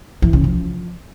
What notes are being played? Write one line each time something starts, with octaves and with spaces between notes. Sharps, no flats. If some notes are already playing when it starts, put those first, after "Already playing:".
E3
C#3
F3